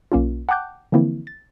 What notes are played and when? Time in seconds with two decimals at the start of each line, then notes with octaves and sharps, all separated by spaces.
0.12 B1 A#3 C#4 F4
0.49 F#5 G5 A5 D6 F#6 G6
0.92 D3 E3 F3 A#3 C4 E4
1.27 A6